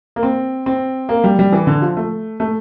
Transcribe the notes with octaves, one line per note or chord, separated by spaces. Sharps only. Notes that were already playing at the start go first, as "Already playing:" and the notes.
A#3
C4
C4
A#3
G3
G3
E3
D3
F3
A3
A3